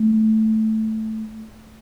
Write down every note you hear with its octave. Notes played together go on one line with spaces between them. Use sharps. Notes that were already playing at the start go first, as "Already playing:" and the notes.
Already playing: A3